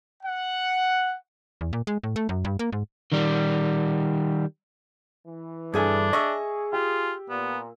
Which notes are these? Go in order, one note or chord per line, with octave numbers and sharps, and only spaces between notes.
F#5
E2
A#2
G#3
A2
A3
F#2
G2
A#3
G#2
D#3 G3
E3
G2 D4 G#4 A4 E5 G#5 G#6
G#4 D#5 E5 C#6 E6
F4 G4
A#2 B3